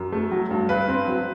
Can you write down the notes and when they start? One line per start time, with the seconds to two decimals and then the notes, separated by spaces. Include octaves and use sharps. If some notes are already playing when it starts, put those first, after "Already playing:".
Already playing: F#2
0.12 A3
0.32 F#3
0.51 G2
0.69 G2 B4
0.88 C4
1.08 F#3